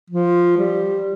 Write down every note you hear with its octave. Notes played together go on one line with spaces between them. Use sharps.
F3
G3